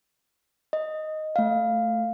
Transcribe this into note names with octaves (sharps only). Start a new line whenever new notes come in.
D#5
A3 F5